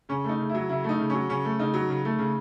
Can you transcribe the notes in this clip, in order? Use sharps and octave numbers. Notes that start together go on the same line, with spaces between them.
C#3 C#4
A3 D#4
C#3
E4
F#3
C#3 E4
A3 D#4
C#3
F#3 C#4
C#3 C#4
A3
C#3 D#4
F#3
C#3
A3
C#3